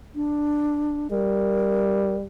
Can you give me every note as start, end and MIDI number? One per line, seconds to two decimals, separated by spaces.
0.15 1.08 62
1.11 2.26 55
1.11 2.16 70